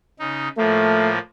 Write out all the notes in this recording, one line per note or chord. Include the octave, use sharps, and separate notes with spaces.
C#3 D#4
A2 F3 A3 A#3